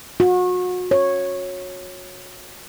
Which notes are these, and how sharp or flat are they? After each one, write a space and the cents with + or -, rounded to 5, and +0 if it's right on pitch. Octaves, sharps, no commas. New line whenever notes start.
F#4 -35
C#5 -10